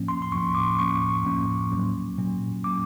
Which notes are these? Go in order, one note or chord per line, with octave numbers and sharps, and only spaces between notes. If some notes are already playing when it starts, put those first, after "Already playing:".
Already playing: A2 F3 A#3 C#4
C6
C6
A2 F3 A#3 C#4 C#6
D6
A2 F3 A#3 C#4 C#6
A2 F3 A#3 C#4
A#2 F#3 A#3 C#4
A#2 F#3 A#3 C#4
A#2 F#3 A#3 C#4 D6